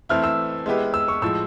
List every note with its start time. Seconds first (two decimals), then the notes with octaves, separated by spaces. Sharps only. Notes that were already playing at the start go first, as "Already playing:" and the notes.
0.09 E3 A3 C4 E4 F6
0.24 E6
0.66 G#3 B3 E4 G4 B4
0.94 E6
1.08 C#6
1.22 A2 F3 G#3 E6